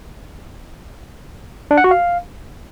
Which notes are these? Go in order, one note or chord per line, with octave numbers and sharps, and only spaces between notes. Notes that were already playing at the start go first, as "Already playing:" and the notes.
D4
F#5
F#4
F5